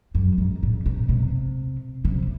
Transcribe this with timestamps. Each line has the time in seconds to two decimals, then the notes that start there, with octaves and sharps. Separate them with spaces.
0.15 F#2
0.38 G#2
0.63 A2
0.86 B2
1.09 C3
2.05 C3